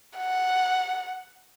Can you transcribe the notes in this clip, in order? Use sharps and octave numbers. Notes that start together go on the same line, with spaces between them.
F#5